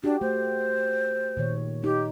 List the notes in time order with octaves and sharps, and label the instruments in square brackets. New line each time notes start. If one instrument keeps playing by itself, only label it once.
[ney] D4 [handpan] F#4 G4
[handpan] A3 [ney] C5
[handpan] A#2 D#3 C#5
[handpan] D#4 [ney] G4